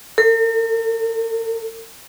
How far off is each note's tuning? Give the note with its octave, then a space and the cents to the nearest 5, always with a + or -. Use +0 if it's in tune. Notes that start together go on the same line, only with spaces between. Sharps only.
A#4 -45